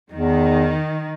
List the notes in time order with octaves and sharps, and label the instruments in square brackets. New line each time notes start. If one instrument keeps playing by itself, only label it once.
[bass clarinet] E2 [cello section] D#3